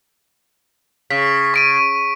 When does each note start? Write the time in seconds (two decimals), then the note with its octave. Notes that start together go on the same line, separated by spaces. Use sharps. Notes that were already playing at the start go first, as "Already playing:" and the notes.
1.10 C#3 B6
1.54 C#6 D7 D#7